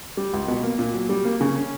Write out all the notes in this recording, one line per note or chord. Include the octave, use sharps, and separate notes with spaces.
G3
C#2
B2
A#3
A#2
F#3
G3
A#3
C#3
C#4